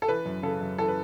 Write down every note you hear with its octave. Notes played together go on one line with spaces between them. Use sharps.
A4
E3 B4
F#2
C#3 A4
F#2
E3 A4
B4